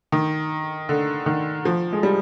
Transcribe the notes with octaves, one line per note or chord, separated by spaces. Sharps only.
D#3
D3
D#3
F3
G#3
G3